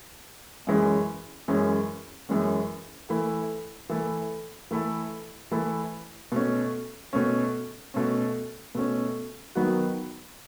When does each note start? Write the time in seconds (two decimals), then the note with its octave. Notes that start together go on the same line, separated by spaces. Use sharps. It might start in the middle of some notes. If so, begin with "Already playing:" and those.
0.67 F#2 E3 G#3 C#4
1.48 F#2 E3 G#3 C#4
2.29 F#2 E3 G#3 C#4
3.09 E3 A3 E4 A4
3.89 E3 A3 E4 A4
4.71 E3 A3 E4 A4
5.52 E3 A3 E4 A4
6.32 B2 A3 C#4
7.13 B2 A3 C#4
7.94 B2 A3 C#4
8.75 B2 A3 C#4
9.55 D#3 F#3 B3 D#4 F#4